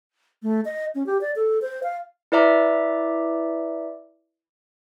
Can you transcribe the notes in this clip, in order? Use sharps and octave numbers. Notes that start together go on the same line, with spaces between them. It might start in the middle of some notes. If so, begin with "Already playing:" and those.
A3
D#5
C#4
G4
D5
A4
C5
F5
E4 B4 D5 E5 A#5 D6